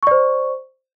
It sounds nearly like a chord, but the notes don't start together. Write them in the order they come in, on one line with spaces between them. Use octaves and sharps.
C#6 D5 C5